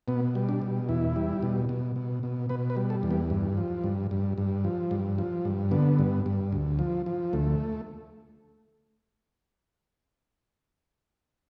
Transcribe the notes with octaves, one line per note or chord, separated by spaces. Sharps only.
B2 B3
G3
D4
B2
E2 E4
G3
B2
B2
B2
B2
B2 B4
B4
G3
A4
E2
B3
G2
F3
G2
G2
G2
F3
G2
F3
G2
D3 B3
G2
G2
D2
F3
F3
D2 A3